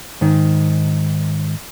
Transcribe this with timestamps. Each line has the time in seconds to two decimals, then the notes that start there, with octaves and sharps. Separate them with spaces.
0.21 G#2 D#3